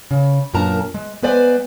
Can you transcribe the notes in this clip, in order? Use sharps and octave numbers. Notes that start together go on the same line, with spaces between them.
C#3
F#2 A#2 D4 A#4 A5 A#5
G#3
G#3 B3 B4 C5 D5 G#5